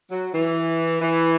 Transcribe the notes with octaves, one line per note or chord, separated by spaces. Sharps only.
F#3
E3
E3